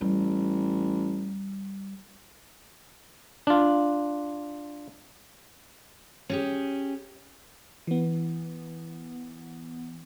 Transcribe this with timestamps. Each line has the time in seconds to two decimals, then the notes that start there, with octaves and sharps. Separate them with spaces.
0.01 A1 G3
3.47 D4 F4
6.30 C#4 G4 G#4
7.87 E3 B3